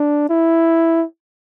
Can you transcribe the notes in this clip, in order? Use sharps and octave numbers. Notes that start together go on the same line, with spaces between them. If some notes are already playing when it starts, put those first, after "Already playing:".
Already playing: D4
E4